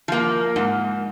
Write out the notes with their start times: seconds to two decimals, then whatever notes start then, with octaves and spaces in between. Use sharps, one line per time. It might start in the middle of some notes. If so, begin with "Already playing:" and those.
0.08 F3 A#3
0.56 G#2